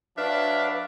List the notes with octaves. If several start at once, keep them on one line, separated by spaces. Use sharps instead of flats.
F#3 D4 B4 E5 F5